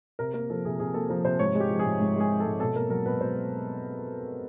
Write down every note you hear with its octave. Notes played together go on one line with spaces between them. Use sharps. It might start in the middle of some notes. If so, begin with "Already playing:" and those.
C3 A#4
A#3 A#4
F3 A4
C3 G#4
C3 G#4
A#3 A4
F3 A#4
C3 C5
G#2 C#5
G#3
G4
F3
G#4
G#2
G#2
G#3 G#4
F3
A4
G#2
B2 A4
A#3 A#4
F#3 A#4
B2 B4
B2 C5